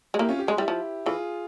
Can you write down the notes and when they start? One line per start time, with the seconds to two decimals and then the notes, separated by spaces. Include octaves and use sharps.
0.14 G#3
0.19 A#3 E4 G4
0.29 C#4 F4
0.39 G4
0.47 G#3 G#4
0.57 G3 E4 G4
0.68 F3
1.06 E3 F4 G#4